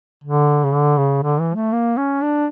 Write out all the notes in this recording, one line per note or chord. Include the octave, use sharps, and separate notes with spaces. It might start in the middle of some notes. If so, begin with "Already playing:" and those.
D3
C#3
D3
C#3
D3
E3
A3
A#3
C#4
D4